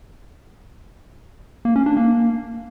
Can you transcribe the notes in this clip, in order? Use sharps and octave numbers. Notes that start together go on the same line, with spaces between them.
A#3
C#4
D4
A#3